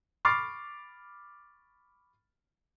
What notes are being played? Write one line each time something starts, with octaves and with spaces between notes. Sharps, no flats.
B5 C#6 D6 F6 A6 C7